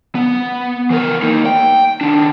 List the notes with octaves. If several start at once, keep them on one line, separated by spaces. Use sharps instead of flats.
B3
E3 A#4
A#3 D#4
G5
D#3 D4